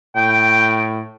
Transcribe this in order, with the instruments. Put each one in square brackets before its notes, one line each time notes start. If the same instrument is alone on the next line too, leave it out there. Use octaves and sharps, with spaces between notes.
[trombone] A2 [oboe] G5